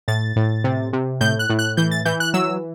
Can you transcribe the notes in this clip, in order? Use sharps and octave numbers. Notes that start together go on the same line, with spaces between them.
A2 A6
A2
C3
C3
A2 G6
F#6
A2
F#6
E3 G6
A6
E3 G6
F#6
F#3 E6